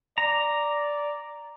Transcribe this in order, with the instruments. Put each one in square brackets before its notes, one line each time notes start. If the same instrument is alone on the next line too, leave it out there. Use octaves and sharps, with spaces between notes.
[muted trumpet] D5 [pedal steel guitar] A#5